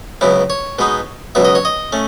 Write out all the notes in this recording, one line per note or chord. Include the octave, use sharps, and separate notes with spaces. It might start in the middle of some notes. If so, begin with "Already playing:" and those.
C#2 C#3 F#3 B3 E4
C#5
B2 G#3 B3 D#4
C#2 B2 F#3 B3 E5
D#5
C#5
D#5
A3 C#4